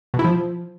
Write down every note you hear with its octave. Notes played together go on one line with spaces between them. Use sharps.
B2
E4
F3